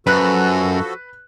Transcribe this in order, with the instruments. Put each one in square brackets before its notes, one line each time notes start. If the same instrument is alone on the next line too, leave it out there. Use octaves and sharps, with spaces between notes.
[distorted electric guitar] F#2 [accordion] F3 F#4 A4 [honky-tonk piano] B4 F#6